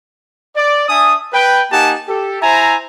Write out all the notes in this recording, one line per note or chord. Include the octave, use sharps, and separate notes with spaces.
D5
D4 E5 G#5 D#6
B4 G5
A#3 D#4 G4 F#5 G#5 A5
G4 A4
E4 C5 E5 G#5 A#5